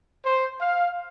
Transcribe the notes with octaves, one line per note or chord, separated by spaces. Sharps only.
C5
F5